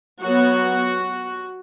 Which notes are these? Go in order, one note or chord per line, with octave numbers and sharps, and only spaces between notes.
F#3 B3 F#4